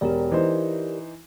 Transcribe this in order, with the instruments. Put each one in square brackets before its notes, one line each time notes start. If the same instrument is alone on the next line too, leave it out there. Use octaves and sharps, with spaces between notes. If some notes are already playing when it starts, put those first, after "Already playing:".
[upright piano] E1 [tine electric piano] G4 A#4 D5
[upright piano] E3 D#4 C5